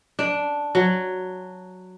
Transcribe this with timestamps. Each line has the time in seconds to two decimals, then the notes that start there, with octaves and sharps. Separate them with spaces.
0.19 D4
0.75 F#3